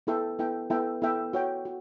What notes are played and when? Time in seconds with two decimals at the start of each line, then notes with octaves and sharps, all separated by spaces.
0.07 B3 E4 A4 E5 G5
0.39 B3 E4 A4 E5 G5
0.70 B3 E4 A4 E5 G5
1.02 B3 E4 A4 E5 G5
1.33 F#4 C#5 G5
1.65 F#4